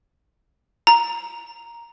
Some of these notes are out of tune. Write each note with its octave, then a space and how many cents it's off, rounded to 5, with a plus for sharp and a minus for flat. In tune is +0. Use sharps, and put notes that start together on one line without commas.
A#5 +5